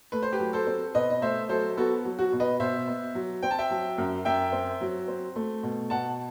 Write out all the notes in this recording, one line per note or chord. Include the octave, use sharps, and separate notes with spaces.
A3 B4
C5
G4 B4
F#3
A4 C5
C4
B2 B4 D#5
D#5
A3 C5 E5
F#3 A4 C5
B3 F#4 A4
F#3
F#4
B2
B4 D#5
B2 C5 E5
B3
F#3
C4 G5
A5
E5 G5
F#3
F#2
F#2 E5 G5
C4
F#3
C4
A3
B2
B2 F#5 A5